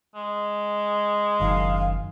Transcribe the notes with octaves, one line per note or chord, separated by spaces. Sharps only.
G#3
F#1 F#2 D#3 F5